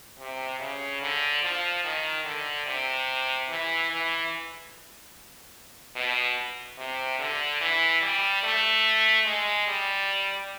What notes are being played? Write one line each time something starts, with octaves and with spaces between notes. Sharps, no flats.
C3
C#3
D3
F3
D#3
D3
C3
E3
E3
B2
C3
D3
E3
G3
A3
G#3
G3